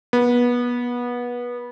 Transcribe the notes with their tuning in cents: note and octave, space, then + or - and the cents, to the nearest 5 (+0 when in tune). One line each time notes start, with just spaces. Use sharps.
B3 -25